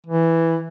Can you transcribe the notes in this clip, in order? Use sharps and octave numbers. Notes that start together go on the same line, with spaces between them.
E3